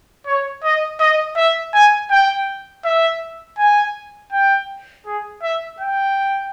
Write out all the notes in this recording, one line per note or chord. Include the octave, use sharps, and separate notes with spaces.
C#5
D#5
D#5
E5
G#5
G5
E5
G#5
G5
G#4
E5
G5